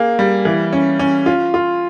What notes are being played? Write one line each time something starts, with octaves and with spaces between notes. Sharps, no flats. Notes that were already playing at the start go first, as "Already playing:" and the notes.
Already playing: A#3 G#4
G3
E3
C#4
C#4
F4
F4